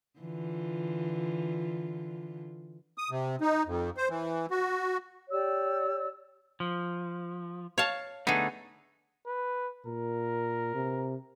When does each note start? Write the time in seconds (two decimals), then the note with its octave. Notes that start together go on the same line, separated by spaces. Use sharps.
0.19 D3 E3 F4
2.98 D#6
3.11 C3
3.41 D#4
3.67 F2
3.97 C5
4.09 E3
4.51 F#4
5.30 G4 C#5 D5 E6
6.60 F3
7.78 C#5 F5 A5
8.27 D3 A3 B3 D#4 G#4
9.26 B4
9.86 A#2 A#4
10.75 C3